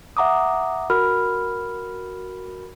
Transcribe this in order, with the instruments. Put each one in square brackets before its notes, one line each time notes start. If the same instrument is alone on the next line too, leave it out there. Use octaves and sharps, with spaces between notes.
[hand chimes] E5 F#5 A#5 D6 D#6
F#4 A#4 B5 F6